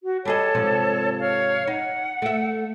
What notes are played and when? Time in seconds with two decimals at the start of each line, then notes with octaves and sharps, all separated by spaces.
0.03 F#4
0.25 G3 G#4 A4 C#5 D#5 A5
0.55 G#2 C3 F3
1.19 C#5 F5 F6
1.67 D#4 F#5
2.22 A3 E5